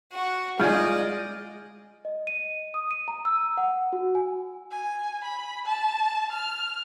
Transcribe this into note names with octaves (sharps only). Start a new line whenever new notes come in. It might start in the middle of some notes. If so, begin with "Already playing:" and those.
F#4
G#3 F4 G#4 D5 D#5 F6 G6 G#6
D#5
D#7
D#6
D#7
A#5
E6
F#5
F#4
G#5
G#5
B5
A5
F6